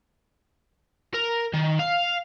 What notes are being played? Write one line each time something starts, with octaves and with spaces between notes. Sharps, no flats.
A#4
D#3
F5